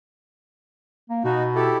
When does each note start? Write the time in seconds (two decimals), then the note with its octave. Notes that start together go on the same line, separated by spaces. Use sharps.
1.10 A#3
1.24 B2 D#4 F#4
1.55 E4 G4 A4